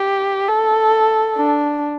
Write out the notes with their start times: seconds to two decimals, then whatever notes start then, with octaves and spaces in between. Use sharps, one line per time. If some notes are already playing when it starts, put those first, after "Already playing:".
Already playing: G4
0.49 A4
1.37 D4